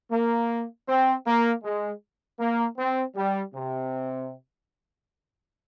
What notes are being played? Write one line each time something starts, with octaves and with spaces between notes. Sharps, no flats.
A#3
C4
A#3
G#3
A#3
C4
G3
C3